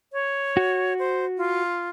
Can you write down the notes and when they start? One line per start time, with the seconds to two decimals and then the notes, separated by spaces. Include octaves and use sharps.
0.13 C#5
0.57 F#4
0.99 C5
1.38 F4